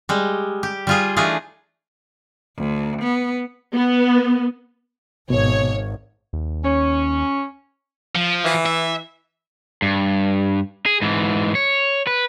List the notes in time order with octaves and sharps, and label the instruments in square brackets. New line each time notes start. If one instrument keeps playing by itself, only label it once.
[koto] G3 G#3
G4
G3 F4 G#4
E3 A3 D4 D#4 F4 G#4
[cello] D2
B3
[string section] B3
[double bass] G#1 [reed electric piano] B2 [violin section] C#5
[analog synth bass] D#2
[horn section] C#4
[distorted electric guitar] F3
[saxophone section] E3
[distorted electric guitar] E5
[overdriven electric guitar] G2
G#4
G#2 E3
C#5
B4